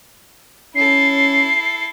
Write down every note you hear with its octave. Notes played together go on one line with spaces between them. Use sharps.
C#4 E4 A4 C7